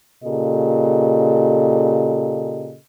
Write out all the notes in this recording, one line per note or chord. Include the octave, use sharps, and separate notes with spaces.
A#2 C#3 G4 A4 D#5